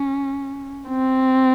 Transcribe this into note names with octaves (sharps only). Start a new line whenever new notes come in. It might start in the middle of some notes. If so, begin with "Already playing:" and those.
Already playing: C#4
C4